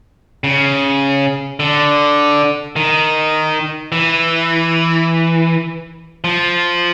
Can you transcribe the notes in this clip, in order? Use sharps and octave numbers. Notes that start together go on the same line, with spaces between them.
C#3
D3
D#3
E3
F3